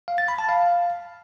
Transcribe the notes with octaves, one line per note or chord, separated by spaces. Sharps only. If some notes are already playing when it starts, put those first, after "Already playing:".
F5
A6
B5
A5
F5